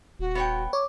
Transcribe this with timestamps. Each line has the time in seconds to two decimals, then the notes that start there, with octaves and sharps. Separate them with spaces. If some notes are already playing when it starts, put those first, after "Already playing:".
0.19 D#1 F#4
0.35 B3 C#5 G5
0.73 C#5 D6